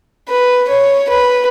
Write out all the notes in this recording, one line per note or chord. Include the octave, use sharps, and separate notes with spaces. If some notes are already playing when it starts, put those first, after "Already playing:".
B4
C#5
B4